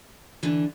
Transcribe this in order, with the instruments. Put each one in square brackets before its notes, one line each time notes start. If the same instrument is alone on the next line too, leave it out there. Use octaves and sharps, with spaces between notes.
[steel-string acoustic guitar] D3 E3